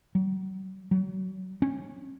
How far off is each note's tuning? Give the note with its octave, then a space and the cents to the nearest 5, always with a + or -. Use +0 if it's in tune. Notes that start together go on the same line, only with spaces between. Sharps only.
F#3 +40
F#3 +30
C#4 -25